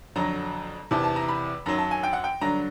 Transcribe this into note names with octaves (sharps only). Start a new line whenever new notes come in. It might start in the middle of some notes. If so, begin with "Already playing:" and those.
F2 D3 F#3 A#5
E2 C3 E3 A5
A5
A#5
B5
F#2 D#3 F#3 A#5
A5
G#5
G5
F#5
G5
G2 D3 F#3 A#5